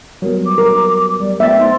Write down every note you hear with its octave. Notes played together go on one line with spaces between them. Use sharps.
F#3 G3 B3 A#4
D6
A#4
G3 D5
A3 B3 E5 G5 A6
D#4 C5 C6